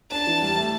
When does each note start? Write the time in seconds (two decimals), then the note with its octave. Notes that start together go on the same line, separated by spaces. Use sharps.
0.11 D4 A5
0.27 E3
0.42 G3
0.58 A3